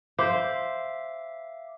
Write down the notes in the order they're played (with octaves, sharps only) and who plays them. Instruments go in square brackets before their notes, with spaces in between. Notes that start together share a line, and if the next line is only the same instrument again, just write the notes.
[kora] C5 [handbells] E5 F5 D6